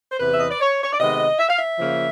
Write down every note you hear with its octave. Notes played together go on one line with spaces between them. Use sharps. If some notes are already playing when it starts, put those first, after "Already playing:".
C5
E2 C3 E3 B4
E5
D#5
D5
C#5
C#5
D5
C3 D#3 G#3 B3 D#5
E5
F5
E5
C#3 F3 A#3